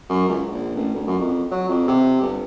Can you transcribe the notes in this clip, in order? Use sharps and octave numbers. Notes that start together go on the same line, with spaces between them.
F#2
C#2
A#1
A1
D2
F#2
F2
F#3
F2
C3
G1